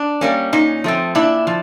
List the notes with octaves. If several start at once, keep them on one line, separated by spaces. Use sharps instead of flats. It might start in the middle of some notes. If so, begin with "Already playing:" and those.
Already playing: D4
G3 A#3 C#4
A#2 C#4 D#4
F3 A3 C4
A#2 D4 E4
F3